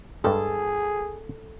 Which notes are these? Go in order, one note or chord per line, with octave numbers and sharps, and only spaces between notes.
G2 G3 G#3 G#4 A4